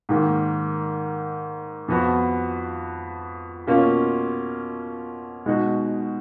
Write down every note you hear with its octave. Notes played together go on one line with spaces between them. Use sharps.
G#2 D#3 A#3
F2 F3 B3 F#4
B2 A#3 C#4 F4
B2 G#3 D#4 F#4